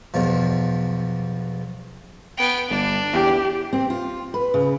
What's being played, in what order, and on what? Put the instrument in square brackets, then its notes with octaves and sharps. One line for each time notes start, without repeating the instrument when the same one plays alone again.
[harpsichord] B1 E2 B2 F3
[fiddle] B3 G5
[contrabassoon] G1 [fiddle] D4
[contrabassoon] E2 [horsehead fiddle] G4
[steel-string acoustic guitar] C4
F4
B4
C#3